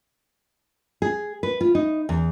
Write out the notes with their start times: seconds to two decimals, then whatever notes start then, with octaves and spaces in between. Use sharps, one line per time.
1.02 G#4
1.43 B4
1.61 F4
1.75 D#4
2.09 E2